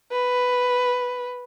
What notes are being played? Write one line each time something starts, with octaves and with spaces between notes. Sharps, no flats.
B4